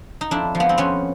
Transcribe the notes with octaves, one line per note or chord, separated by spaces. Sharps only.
D#4
F2 D4 E4
F3
B3
C4
F2 B3 C#4